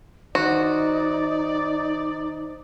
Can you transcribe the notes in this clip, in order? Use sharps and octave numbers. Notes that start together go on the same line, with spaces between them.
D#3 D#4 F#4 C5 D5